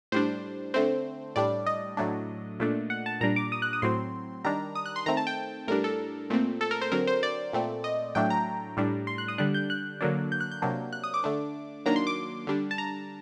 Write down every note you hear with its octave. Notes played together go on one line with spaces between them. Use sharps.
A2 G3 D4 C5
D3 A3 C4 C5
A2 G3 D4 D5
D#5
A2 F#3 A3 D4
A#2 A3 D4
F#5
A5
A#2 G3 D4 A#5
D6
D#6
F#6
D#6
A2 F#3 C4 C6
D#3 G3 D4 A#5
D#6
F#6
C6
D#3 A3 C4 A#5
A5
G5
A2 G3 D4 A#4
A4
A#2 A3 C4
A4
A#4
C5
D3 F#3 C4 A#4
C5
D5
A#2 A3 C4
D#5
A2 F#3 A3 D4 G5
A#5
A2 G3 D4
C6
F#6
D#6
D3 G3 D4 F#6
G6
F#6
D3 F#3 A#3 D4
G6
F#6
G6
C3 F#3 A#3 D4
F#6
D#6
D6
D3 A3 D4
D#3 F#3 A#3 D4 A#5
C6
D6
D3 G3 D4
A5
A#5